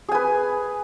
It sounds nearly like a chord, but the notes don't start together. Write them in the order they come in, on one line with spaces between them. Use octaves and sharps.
G#4 G#5 B4